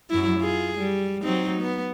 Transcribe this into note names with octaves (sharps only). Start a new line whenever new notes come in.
F#2 F#3 E4
F4 G#4
G3
F#3 C4 D#4
B3